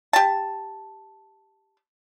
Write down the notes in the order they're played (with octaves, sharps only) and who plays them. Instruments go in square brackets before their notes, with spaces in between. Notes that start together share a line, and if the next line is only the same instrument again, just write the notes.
[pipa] G4 A5